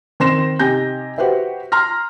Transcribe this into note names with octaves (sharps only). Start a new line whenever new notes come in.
D#3 C4 C6 A#6 E7
C3 D#4 G4 G#5 G6 A#6
F#4 G4 B4 C5 E5
A#5 C6 F6 A#6